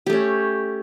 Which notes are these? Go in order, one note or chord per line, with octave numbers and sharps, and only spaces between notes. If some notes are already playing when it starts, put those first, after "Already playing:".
A3 C#4 G4